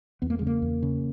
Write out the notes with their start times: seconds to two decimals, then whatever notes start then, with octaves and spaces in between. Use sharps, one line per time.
0.22 E2 B3
0.30 A#3
0.39 G#3
0.41 C#3
0.47 A#3
0.62 E2
0.83 C#3